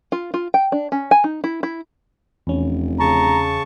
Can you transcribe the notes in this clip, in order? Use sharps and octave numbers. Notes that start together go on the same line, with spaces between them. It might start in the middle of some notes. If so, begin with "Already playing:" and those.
F4
F4
G5
D4
C#4
G#5
D#4
E4
E4
F1 E2 C#4
C#3 A5 A#5 C#6